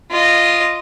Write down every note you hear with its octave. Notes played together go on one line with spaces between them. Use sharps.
F4 D#5